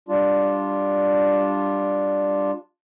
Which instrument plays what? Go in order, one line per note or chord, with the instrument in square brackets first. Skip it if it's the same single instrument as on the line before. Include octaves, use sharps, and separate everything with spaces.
[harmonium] G3 D4 F4